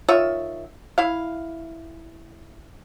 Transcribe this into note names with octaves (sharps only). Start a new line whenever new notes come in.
D#3 F4 C#5 E5
E4 F5